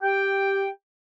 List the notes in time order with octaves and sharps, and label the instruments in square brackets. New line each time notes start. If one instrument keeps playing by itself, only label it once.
[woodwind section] G4 G5